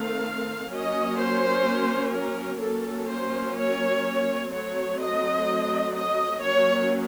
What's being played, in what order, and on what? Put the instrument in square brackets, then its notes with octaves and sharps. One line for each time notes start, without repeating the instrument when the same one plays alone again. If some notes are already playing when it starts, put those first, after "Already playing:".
Already playing: [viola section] D#3 A3 C4 F5
F#3 A#3 C#4 D#5
C5
A#4
F#3 A#3 C#4 A4
C5
C#5
F#3 A3 C4 C#5
D#5
D#5
F#3 A#3 C#4 C#5